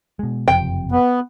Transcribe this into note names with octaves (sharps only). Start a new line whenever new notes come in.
B2 G#3
F#1 F2 C3 G5
B3